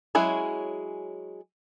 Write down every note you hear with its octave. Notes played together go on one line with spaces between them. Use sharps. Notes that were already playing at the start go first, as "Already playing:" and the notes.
F#3 G#3 C#4 E4 G#4